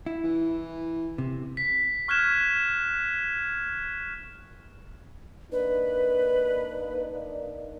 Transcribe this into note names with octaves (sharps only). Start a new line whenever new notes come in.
E4
E3
C3
B6
C#6 F6 F#6 G#6 E7
A#3 D4 D#4 B4